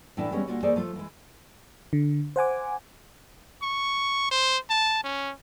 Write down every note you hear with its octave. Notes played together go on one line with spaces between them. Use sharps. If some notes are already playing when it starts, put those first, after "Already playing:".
A2 E3 D4 E4
E3 G3 G#3 B3 C#4
D2 A#3 F4 F#4
E3 A3 A#3 G#4 C5 D5
F3 A3 F4
E3 G#3
D3
C5 F#5 G#5 D6
C#6
C5
A5
C#4